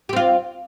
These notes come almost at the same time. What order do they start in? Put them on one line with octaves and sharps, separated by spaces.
G4 C4 F4